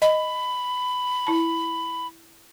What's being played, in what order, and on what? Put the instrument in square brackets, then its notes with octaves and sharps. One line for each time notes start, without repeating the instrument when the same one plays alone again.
[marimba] D#5 [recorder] B5
[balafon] E4 A5